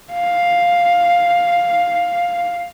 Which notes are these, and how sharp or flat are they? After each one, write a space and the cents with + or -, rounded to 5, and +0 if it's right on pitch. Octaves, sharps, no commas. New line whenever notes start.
F5 +5